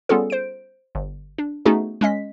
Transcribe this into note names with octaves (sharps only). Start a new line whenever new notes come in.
G3 B3 C#4 F4 G#4 A4
C5 D7
G1
D4
A3 B3 C#4 D#4 F#4 G#4
G#3 C#4 D#5 B6